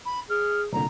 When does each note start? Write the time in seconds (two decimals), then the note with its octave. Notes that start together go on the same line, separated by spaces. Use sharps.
0.05 B5
0.29 G#4 F6
0.72 C2 A#2 D3 A#5